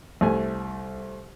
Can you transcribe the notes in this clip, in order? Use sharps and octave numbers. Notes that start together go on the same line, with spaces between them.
C2 A3 G#5